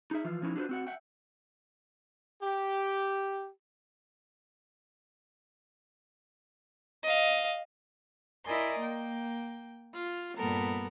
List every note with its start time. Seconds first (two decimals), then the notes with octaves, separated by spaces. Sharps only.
0.11 D#4 G#4 E5
0.25 E3 F3 F4
0.42 F3 C#4 D#4 E4
0.56 D4 F4 F#4 G#4 B4 C5
0.69 C4 F#4 F#5
0.87 E5 F#5 G5
2.42 G4
7.03 D#5 F5
8.45 E4 A#4 D5 D#5 G#5 C6
8.79 A#3 G5
9.93 F4
10.36 G2 A#2 G3 B3 A4 A#4